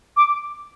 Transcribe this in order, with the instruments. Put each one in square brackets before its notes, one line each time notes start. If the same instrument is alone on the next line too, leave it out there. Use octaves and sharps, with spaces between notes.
[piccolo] D6